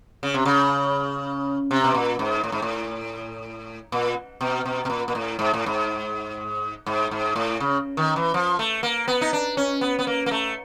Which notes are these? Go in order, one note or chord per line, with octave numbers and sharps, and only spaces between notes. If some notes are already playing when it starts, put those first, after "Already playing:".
C#3
C3
C#3
C3
B2
A#2
G#2
A2
G#2
A2
A#2
B2
B2
B2
A#2
A#2
A2
G#2
A2
G#2
G#2
G#2
A2
C#3
D#3
E3
F3
A3
A#3
B3
D#4
D4
C#4
B3
B3
A#3
A#3
A3